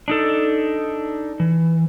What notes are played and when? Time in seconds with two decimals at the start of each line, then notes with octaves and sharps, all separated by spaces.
0.08 D4 D#4 A4
1.40 E3